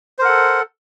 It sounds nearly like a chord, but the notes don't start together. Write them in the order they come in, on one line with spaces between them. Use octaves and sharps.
C5 A#4 F#5 A4